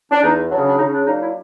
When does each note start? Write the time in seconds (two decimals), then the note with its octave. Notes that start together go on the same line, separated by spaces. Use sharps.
0.12 D4
0.23 E2 D#4
0.51 C#3 F#3 D4
0.68 D4
0.79 C#3 D#4
0.93 D4
1.06 F#3 A#3 D4 D#4
1.20 E4